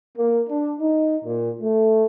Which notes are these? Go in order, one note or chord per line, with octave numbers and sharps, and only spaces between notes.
A#3
D4
D#4
A#2
A3